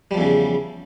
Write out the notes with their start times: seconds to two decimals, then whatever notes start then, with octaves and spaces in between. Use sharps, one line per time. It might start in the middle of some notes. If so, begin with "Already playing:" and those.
0.11 G3
0.14 F3
0.17 E2
0.21 C#3